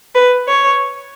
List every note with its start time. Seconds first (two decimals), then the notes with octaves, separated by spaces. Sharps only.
0.15 B4
0.48 C#5